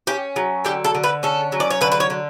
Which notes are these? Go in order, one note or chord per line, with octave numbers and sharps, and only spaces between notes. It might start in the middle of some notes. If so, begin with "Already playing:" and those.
C#4 G4
F#3
D3 G4
A4
D3
B4
C#4 A4
F#3
D5
C#5
D3 B4
B4
C#5
D3